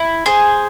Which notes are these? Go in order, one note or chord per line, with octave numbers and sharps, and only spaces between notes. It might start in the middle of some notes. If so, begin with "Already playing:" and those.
Already playing: E4
G#4 C5